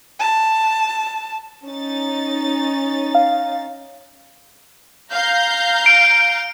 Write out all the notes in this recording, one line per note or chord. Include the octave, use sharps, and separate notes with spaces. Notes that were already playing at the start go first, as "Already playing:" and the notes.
A5
C#4 D#4 A6
F5
F5 A#5 G6
D7